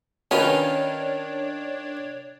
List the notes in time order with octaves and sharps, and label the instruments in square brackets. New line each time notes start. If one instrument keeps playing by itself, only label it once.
[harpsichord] D#3 F4 [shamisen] C#4 B4 [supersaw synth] D4 [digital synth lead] C#5